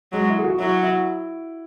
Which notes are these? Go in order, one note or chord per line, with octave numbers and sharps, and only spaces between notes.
F#3 G#3
E4
G#4
F#4
F#3 E4
E4